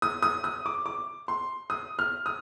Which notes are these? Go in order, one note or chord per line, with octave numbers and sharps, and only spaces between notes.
D#6
D#6
D#6
D6
D6
C6
D#6
F6
D#6